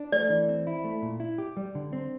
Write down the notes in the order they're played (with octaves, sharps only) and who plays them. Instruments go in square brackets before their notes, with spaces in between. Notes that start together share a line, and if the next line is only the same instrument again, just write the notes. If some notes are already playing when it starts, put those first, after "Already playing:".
Already playing: [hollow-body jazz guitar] D4
[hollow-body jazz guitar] A3 [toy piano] D5
[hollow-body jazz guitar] E3
C4
E4
A3
A#2
E4
G4
G3
D3
C4